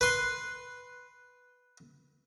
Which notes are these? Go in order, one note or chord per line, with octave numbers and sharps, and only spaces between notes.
B4 C6